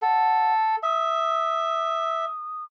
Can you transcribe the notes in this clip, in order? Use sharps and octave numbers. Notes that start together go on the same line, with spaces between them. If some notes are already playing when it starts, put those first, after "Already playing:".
A4 F#5
E5 D#6